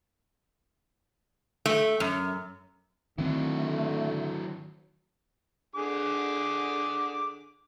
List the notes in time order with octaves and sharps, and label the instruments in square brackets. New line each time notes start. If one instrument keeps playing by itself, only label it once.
[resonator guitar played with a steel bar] A3
F#2
[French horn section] D3 [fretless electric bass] D#3 C4 [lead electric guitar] F#3 E4 [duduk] A3
[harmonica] D3 G#4 D6